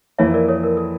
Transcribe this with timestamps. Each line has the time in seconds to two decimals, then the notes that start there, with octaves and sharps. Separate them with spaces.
0.18 F2 E3 A#3 E4 C#5 E5
0.34 A#4 D5
0.48 A4 C#5
0.63 A#4
0.77 A4